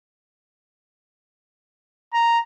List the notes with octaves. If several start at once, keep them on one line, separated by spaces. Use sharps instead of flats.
A#5